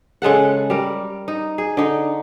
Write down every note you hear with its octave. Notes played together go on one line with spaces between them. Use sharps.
C#3 G#3 A4 F#5
G3 A#4
D#4
G#4
D3 D#4